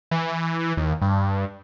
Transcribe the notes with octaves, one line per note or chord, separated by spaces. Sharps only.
E3
D#2
G2